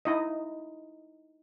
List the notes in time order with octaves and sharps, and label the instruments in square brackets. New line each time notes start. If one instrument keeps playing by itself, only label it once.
[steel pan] D#4 E4 D#5